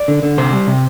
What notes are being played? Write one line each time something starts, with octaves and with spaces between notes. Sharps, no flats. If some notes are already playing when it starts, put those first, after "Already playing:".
Already playing: D5
D3
D3
C3 C5
G3
C3